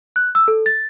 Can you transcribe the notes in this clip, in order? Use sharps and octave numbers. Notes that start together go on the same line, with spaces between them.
F#6
E6
A4
A6